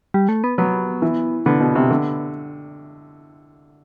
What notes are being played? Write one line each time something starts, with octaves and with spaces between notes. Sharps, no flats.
G3
A3
B3
F#3 B3
E3
D3 B3
B2
C3
D3